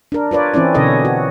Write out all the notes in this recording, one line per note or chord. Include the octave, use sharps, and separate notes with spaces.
D4 A#4
F4 B4 C#5 D5
E3 C4 C#4 E4 D5
B2 D3 C#4 A4 C#5 D#5
F#4